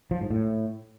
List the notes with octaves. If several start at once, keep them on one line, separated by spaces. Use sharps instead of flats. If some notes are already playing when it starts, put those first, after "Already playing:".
F3
G#2
A2